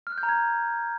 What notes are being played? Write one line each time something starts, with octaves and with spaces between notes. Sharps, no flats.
F6
F#6
G6
A#5
G#6